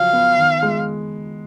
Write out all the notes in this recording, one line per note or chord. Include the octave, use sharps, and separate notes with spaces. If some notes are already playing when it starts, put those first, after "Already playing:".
Already playing: C#3 F3 F#3 F5
B3
D#3
G#3